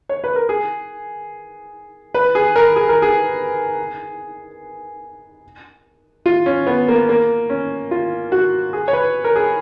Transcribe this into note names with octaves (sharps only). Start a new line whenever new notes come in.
C#5
B4
A#4
G#4
B4
G#4
A#4
G#4
A#4
G#4
F4
C#4
B3
A#3
A#3
C#4
F4
F#4
G#4
C#5
B4
A#4
G#4